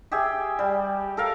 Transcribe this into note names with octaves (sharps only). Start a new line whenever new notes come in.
G4 G#4 E5
G3
A4 A#4 F5